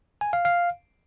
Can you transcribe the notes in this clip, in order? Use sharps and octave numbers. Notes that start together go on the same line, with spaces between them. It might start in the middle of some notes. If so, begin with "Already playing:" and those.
G#5
F5
F5